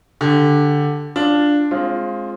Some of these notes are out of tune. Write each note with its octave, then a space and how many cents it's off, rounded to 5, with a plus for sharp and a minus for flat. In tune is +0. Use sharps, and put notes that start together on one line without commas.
D3 +0 G4 +5
D4 +0 F4 +0
G#3 +10 C4 +30 F4 +0